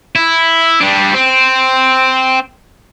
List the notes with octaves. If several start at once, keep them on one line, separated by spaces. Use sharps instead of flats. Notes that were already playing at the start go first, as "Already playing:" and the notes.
E4
G3 D4
C4